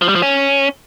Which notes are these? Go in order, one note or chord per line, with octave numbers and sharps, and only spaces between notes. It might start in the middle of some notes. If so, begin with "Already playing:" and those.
F3
G3
F3
C#4